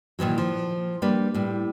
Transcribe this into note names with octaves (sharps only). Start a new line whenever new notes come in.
A#2 D#3 E3 F#3
F3
G3 A#3 D4 B4
A2 G3